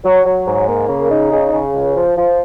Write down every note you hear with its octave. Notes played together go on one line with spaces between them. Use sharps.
F#3
F#3
G#2
A#3
C#3
D#4
C#3
C#3
C#2
F3
F3